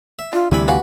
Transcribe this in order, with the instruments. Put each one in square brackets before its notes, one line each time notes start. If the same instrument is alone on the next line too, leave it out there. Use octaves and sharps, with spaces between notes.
[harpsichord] E5
[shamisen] D4 [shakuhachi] F4
[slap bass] D2 C3 E3 [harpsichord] G3 G#5 B5 [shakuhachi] E4
[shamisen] A3 F5 G#5 [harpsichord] F#4 B4 F#5 [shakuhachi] G4